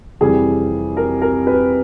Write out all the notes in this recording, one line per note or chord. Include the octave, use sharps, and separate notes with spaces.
F2 C3 E3 G3 G#4
A#4
A#4
B4